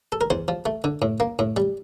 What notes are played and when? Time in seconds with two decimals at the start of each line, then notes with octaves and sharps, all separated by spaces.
0.12 A4
0.21 A#4
0.30 E2 C5
0.48 F3
0.66 A3
0.84 D3
1.02 A2
1.20 A#3
1.39 A2
1.57 G3